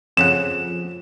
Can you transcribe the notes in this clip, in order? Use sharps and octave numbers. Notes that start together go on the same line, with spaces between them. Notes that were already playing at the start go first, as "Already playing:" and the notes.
F2 C#3 F3 F#5 E7